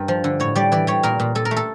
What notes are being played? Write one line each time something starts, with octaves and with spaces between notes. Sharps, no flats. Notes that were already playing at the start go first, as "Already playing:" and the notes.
Already playing: G2 A#4
F3
D3
A2 C#5
G3 D5
E3 D5
G3 C#5
A#2 A#4
A#2
A#2 A4
A#4
A3
A4